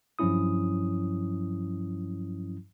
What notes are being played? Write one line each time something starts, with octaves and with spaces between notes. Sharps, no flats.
G2 F3 F#3 C#4 E4 D#6